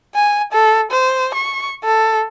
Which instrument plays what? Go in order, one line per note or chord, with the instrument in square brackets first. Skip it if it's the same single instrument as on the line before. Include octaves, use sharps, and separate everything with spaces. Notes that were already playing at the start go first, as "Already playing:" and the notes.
[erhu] G#5
A4
C5
C#6
A4